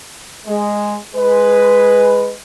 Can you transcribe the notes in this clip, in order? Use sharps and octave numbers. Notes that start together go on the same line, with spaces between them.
G#3
G#3 B4